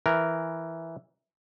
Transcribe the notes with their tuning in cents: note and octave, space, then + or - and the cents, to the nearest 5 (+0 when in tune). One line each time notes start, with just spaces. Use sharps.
E3 +0 A#4 +0